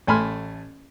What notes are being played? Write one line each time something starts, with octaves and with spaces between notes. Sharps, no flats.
A1 A3 G#5 B5 C6 F6